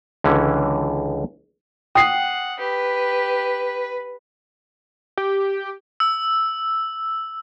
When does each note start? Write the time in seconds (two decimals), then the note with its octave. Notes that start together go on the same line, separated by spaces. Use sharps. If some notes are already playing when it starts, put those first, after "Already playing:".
0.24 C#2 D3 E3 C#4
1.95 F#5 G5 D#6 C7
2.60 G4 B4
5.17 G4
6.00 E6